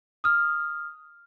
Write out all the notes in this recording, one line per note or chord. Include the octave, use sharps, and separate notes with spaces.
D#6 F6